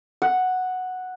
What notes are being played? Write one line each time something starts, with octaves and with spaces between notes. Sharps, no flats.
F#5